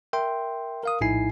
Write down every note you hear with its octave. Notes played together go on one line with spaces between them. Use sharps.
A#4 E5 G5 C6
A#4 F5 D#6
A#1 A2 D#4 E4 G#5 C7